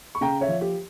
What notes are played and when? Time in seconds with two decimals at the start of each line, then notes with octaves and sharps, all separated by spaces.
0.15 C#6
0.21 C#3 G5 A#5
0.41 C#5 E5
0.48 F3
0.61 G4